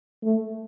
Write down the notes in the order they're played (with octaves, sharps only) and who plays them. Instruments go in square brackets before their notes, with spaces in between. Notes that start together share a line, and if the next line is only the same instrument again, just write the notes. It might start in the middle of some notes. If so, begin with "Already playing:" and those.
[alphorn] A3